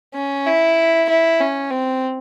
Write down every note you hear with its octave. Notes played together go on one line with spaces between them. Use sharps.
C#4
E4
E4
C#4
C4